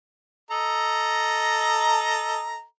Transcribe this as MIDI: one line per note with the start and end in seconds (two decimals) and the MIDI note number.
0.51 2.64 69
0.51 2.64 75
0.51 2.64 82